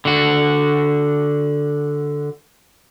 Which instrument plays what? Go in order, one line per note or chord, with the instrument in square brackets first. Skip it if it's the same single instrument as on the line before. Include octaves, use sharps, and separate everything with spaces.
[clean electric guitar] D3 F#4